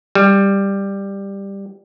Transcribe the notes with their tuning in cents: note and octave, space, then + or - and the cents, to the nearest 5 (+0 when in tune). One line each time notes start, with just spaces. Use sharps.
G3 +10